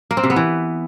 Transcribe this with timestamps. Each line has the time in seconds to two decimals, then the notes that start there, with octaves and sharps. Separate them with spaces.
0.11 A#3
0.17 C4
0.23 C3
0.30 B3
0.36 E3